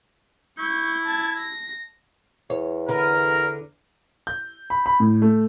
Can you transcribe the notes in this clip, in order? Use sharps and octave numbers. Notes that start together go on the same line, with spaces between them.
E4 C#6 G6
A5 G#6
A#6
E2 C#5
D3 A#4 B4 A#5
G6
B5
B5
A2
A3